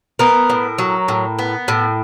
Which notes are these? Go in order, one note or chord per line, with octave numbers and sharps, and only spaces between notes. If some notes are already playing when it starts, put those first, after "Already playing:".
B3 A#4
A2
F#3
A2
B3
A2